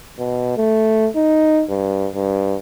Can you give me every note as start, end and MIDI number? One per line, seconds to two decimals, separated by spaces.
0.19 0.52 47
0.57 1.08 57
1.16 1.64 63
1.70 2.08 43
2.14 2.57 43